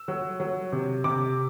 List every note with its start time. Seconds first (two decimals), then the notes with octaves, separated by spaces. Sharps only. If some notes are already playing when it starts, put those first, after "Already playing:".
Already playing: E6
0.08 F#3
0.40 F#3
0.72 C3
1.04 C3 D6